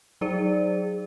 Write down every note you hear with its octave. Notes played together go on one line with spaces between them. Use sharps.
F#3 D#4 G#4 C5 D5